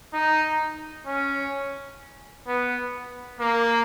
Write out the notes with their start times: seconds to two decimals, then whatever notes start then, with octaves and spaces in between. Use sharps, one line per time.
0.13 D#4
1.07 C#4
2.47 B3
3.40 A#3